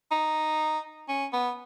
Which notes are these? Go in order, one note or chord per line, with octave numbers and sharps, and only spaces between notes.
D#4
C#4
B3